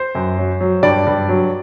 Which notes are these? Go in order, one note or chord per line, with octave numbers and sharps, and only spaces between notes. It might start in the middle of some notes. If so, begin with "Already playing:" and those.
Already playing: C5
F#2
F#3
F#3
G2 D5
G2
F#3